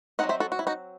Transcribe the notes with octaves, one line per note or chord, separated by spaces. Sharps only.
F#3 C4 D#4 D#5 F#5
C5 E5
F#4 A4
F#4
E4
D#4 F#4